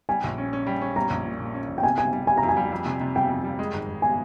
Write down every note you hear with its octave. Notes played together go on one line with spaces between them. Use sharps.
G3 G#5
A#1
C#4
C#4
G3
C#4
G3 A#5
A#1
A#2
A#2
C#4
A#1
G5
C3 G#5
G3 G#5
G3
G3 G#5
A#5
F2
G#5
G3
F2
C3
C3
G3 G5
F2
G3
G#3
G#1
G#1
G#5